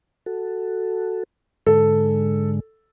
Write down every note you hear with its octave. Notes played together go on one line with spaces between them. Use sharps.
F#4 A4
G#2 D3 G#3 A4